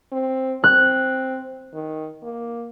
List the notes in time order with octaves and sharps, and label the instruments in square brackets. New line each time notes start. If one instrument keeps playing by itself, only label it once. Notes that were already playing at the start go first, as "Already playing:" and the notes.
[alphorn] C4
[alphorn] C4 [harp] F#6
[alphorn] D#3
A#3